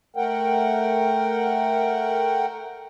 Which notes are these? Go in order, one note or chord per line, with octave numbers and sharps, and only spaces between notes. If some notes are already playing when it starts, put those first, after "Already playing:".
A3 A#4 F#5 G5